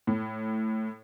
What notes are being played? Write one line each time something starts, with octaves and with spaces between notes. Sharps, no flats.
A2